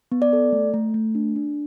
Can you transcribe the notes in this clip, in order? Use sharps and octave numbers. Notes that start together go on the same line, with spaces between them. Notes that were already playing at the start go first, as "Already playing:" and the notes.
B3
D5
A4
A3
A3
A3
D4
D4